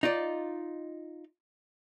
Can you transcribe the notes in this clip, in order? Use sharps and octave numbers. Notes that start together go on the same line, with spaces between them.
D#4 F4 D5